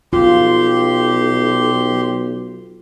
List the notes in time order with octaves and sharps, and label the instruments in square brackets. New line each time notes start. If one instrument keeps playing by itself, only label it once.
[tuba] B1 [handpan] F4 [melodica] G4 C6